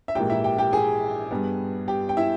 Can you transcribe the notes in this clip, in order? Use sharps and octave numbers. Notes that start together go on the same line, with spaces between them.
E5
A#1 G#2 E3 A#3 G4 G5
E4 E5
G4 G5
G4 G5
G#4 G#5
G2 G3 B3
G4 G5
G5
E4 E5